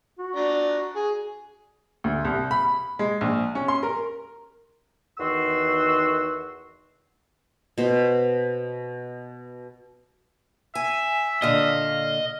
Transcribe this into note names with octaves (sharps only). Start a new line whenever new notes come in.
F#4
D4 A#5
G#4
D2
C2
B5
G#3
A#1
C#4
C6
A#4
E2 D#3 F#4 C6 E6
B2 C5
E5 G#5
A#2 D3 D#5 F5